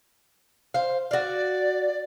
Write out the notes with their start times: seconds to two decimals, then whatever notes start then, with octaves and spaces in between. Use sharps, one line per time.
0.74 C5 F5
1.11 F#4 D5 F5